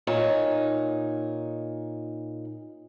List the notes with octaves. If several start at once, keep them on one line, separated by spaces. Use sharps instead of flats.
A#2 D#4 C#5